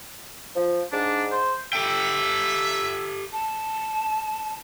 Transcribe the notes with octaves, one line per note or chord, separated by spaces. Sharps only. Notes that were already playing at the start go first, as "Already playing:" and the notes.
F3
G#2 D4
C5
G4 A4 E5 G5
A5